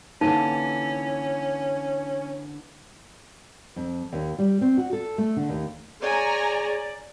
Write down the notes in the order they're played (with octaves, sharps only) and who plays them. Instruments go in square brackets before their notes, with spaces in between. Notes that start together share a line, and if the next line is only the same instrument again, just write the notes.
[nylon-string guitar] D3 E3 A#3 [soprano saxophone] C#4 [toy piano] D#4
[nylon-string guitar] F2
D#2
G3
C4
F#4
A4
A3
D3
D#2
[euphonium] G#4 [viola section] C#5 G#5 A#5 [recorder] D5